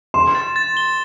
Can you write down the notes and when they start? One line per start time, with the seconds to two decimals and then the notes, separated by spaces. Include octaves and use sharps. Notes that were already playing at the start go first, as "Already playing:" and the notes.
0.14 C6 E7
0.35 A6
0.56 A6
0.77 G7